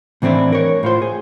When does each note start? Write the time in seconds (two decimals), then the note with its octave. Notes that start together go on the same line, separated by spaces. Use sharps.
0.22 A2 E3 C4 D4 E4
0.52 A#4 C#5
0.83 A2 F4 C5
1.02 G#4